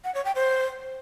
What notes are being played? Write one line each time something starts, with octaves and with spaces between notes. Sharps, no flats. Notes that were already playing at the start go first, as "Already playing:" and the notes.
F#5
C#5
G5
C5